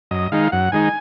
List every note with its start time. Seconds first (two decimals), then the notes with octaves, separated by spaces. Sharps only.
0.11 F#2 D#5
0.32 D#3 G#3 D#4 F5
0.52 F#2 F#5
0.72 D#3 G#3 D#4 G#5